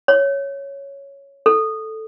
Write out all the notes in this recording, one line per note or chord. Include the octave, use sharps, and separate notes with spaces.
C#5
A4